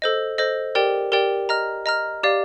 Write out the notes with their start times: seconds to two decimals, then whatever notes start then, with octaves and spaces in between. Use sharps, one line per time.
0.02 A4 C5 D#5
0.38 A4 C5 D#5
0.75 G4 A#4 D5 G5
1.12 G4 A#4 D5 G5
1.49 D#5 A#5 F6
1.86 D#5 A#5 F6
2.23 G4 D5 F5